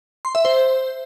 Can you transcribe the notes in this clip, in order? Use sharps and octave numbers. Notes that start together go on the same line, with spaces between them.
C6
E5
C5